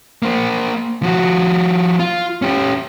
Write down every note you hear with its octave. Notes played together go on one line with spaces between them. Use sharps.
A#3 C5
F3 F#4
F4
C#4 G4